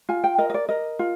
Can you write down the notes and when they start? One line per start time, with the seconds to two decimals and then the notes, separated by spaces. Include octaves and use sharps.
0.09 F4 G#5
0.24 G5
0.38 A#4 D#5
0.50 D#5
0.54 D5
0.69 A#4 D#5
0.99 F4